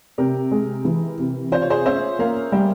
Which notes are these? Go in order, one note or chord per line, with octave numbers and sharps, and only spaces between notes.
C3 G4 A#4
G#3
E3
C3
F4 C5
C#5
G#4 C5
C#4 C5 E5
A#3 C#5 F5
G3 E5 G5